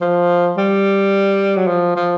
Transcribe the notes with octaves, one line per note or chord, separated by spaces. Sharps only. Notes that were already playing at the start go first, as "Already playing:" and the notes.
F3
G3
F#3
F3
F3